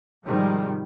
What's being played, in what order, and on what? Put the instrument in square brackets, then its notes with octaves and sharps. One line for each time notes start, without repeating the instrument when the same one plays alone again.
[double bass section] G#2 C3 D#3 F3 G3 G#3